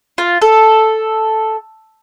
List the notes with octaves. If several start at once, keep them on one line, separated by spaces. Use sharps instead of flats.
F4
A4